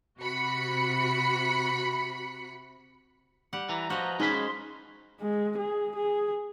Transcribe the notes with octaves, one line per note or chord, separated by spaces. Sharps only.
C3 F#4 B5 C#7
G3 G4 F#5
E3 A#5
F3 F#4 B4 D#5
G#3 C#4 D#4 G#4 C5 B5
C6
G#3
G#4
G#4